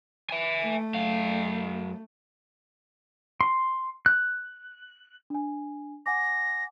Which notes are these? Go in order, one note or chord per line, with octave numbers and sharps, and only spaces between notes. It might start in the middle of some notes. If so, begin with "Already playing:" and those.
E5 G#5
A3
F#2 F5
C6
F#6
D4 G#5
F#5 G#5 D6 A#6